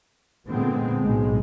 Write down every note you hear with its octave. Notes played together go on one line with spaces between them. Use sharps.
A#2 D3 G#3 B3 C4
B1 A2 G#3